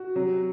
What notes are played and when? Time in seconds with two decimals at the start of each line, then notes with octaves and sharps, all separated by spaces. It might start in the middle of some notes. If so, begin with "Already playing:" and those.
Already playing: F#4
0.15 C3 F#3